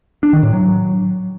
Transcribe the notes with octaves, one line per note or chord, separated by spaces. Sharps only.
D4
D#3
A2
F#3